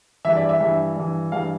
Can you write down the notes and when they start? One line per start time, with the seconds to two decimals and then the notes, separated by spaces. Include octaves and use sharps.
0.25 G2 E3 E5
0.37 D5
0.49 E5
0.61 G2 E3
0.96 G2 E3
1.32 G2 E3 F5